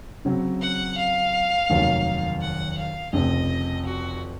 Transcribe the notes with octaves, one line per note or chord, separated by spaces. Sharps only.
C#3 F#3 C4
F#5
F5
F1 D#2 D#3 F#3 C#4
F#5
F5
F1 F2 C#3 D#5
F#4